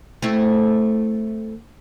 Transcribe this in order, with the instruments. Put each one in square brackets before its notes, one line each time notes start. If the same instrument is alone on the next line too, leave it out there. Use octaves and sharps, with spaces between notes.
[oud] A3 C4 E4